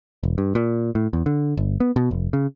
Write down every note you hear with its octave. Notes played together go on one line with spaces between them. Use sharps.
E1
G2
A#2
A2
E2
D3
G1
B3
B2
F1
C#3